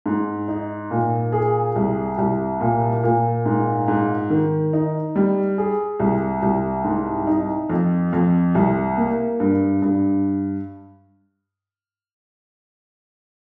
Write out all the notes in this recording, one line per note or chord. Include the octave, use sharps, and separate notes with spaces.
G#2
D#4
A#2
G#4
C2
C2
A#2
A#2
G#2
G#2
D#3
D#4
G3
G#4
C2
C2
G#2
D#4
F2
F2
C2
A#3
G2
G2